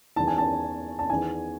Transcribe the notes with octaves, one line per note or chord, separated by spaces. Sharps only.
E2 D#3 A5
G#5
A5
A5
E2 D#3 G#5